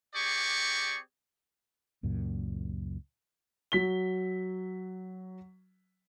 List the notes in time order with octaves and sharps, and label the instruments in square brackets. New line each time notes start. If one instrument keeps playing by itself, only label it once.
[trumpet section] C4 G4 G#4 D5 C#6
[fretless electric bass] C#2 F#2 A#2
[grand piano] F#3 B6 G7